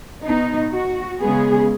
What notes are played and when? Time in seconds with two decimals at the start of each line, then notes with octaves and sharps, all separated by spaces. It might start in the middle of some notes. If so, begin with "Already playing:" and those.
0.23 B2 B3 D#4
0.72 F#4
1.21 C#3 G#3 B3 G#4